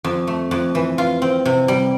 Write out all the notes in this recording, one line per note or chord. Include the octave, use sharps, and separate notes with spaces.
F2
A3
F2
E3
F4
C4
C3
G3